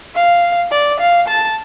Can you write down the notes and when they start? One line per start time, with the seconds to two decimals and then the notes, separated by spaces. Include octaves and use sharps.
0.15 F5
0.71 D5
1.00 F5
1.28 A5